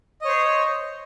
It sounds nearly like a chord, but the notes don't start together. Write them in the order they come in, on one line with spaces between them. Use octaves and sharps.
D#5 C#5 C5